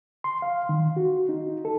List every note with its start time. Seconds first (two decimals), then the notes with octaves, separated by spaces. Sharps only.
0.24 C6
0.42 F5
0.69 D#3
0.97 F#4
1.29 D#4
1.65 A4